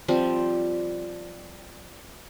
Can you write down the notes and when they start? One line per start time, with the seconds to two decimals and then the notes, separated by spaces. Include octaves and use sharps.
0.08 F3 G3 C4